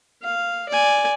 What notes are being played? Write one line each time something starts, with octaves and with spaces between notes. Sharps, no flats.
F5
D5 G#5